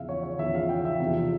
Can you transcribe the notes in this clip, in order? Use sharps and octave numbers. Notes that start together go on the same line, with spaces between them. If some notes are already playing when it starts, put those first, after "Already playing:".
Already playing: E2 C#3 F3 E5 F5
C#5
C#5
E2 C#3 F3 E5
F5
G5
E5
E2 C3 F3